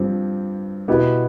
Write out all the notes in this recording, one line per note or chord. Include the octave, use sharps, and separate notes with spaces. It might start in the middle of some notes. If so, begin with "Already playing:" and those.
Already playing: G2 F3 C4 G4
B2 B3 E4 G4